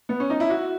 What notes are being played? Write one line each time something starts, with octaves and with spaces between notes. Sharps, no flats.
B3
C#4
D#4
E4
F#4